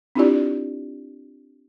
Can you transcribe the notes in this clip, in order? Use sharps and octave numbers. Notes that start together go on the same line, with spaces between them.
C4 D4 E4 F4 G4 D5